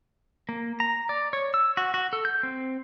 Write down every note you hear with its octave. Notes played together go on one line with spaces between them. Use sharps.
A#3
A#5
D5
C#5
E6
F#4
F#4
A4
G6
C4